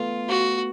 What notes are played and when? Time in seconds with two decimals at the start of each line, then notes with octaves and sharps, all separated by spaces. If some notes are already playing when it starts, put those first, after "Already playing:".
Already playing: A3 B3 F4
0.28 F#4